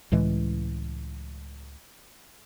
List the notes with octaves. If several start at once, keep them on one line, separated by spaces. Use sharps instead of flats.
C#2 A2 E3 G#3